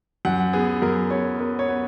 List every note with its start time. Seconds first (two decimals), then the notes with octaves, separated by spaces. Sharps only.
0.25 F#2 F#5
0.53 B3 G#4
0.82 F#2 A#4
1.10 B3 C#5
1.39 B3 A#4
1.59 C#5
1.68 B3